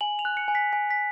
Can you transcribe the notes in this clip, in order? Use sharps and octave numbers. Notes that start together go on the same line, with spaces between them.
G#5 F#7
F7
F#6
C#7
G#5
B6
G#5 B6
B6